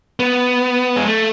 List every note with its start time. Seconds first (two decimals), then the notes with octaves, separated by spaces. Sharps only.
0.20 B3
0.96 G#3
1.07 A3